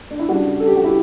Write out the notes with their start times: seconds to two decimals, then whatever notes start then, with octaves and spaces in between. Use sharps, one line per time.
0.11 D4
0.19 E4
0.29 C#3 G3 D4 F#4
0.60 A4
0.68 G4
0.76 F#4
0.84 E4 G4